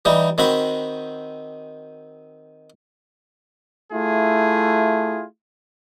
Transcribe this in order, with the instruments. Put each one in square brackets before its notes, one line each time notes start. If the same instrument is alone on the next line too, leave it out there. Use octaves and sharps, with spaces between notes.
[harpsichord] E3 G3 D#4
D#3 C4 F#4 B5
[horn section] A3 E4 F4 G#4